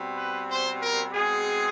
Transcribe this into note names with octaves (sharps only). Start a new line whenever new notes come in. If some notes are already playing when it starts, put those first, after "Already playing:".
Already playing: B2 G3 C4
B4
C5
A#4
B2 G#3 C4 G#4